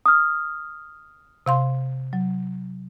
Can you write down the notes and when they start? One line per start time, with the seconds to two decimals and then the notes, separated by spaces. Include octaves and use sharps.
0.06 D#6 F6
1.46 C3 F5 C6
2.13 F#3